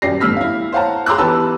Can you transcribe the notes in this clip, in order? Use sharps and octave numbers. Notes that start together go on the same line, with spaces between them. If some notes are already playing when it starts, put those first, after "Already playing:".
D#1 F#2 G4 D5 A#6 C7
G1 A2 E6 F6 B6
E4 F5
C5 C#5 F5 F#5 A5 A#5
G#4 A#5 C6 D6 E6 F#6
E3 B3 G4 B4 A5 E6